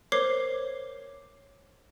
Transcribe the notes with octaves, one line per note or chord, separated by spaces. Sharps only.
A#4 C5 C#5 D6 C7